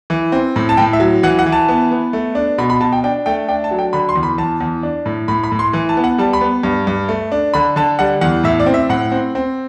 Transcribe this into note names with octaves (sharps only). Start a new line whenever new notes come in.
E3
C4
A2
A5
A2 G5
E5
F#3
E3 F#5
F#5
E3
A5
B3
B3
A3
D4
B2 B5
B5
B2 A5
G5
D4 G5
A3 G5
D4 G5
A5
F#3
G5
D3 B5
C6
E2
B5
E2 A5
E2
D4
A2
A2 B5
B5
A2
C6
E3
A5
B3
F#5
G3 A5
B5
B3
G2
G2
A3
D4
D3 B5
D3 A5
G3 F#5
E2 F#5
A2 E5
D5
C4
E5
A2 F#5
C4
C4